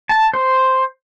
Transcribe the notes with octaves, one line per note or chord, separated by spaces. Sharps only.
A5
C5